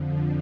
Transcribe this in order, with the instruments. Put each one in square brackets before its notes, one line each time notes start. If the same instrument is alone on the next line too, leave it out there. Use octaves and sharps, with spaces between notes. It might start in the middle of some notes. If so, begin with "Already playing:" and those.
Already playing: [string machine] F2 D3 F3